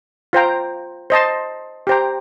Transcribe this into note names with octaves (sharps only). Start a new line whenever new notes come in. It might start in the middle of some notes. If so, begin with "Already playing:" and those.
F4 C5 G5 A#5
C5 D#5 A5 C6
G4 C5 G5 A#5